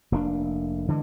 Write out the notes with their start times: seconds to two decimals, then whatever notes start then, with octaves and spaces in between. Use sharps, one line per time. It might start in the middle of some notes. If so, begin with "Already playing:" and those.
0.12 F1 A#3 C#4 D4
0.88 D3 E3 G3 G#3